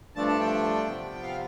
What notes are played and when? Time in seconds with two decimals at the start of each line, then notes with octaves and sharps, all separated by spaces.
0.15 G2 F3 A3 D4 A5
0.27 A5
0.40 G5
0.87 C3 F3 B3
1.23 F5